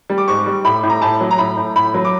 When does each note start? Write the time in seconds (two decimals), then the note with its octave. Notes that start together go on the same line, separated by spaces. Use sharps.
0.10 G3
0.18 D6
0.28 G#2 C#6
0.46 G3
0.65 A2 B5
0.83 A2
0.90 A#5
1.02 A2 A5
1.21 F#3
1.31 A#5
1.38 A2 B5
1.57 A2
1.76 A2 B5
1.94 F#3
2.05 D6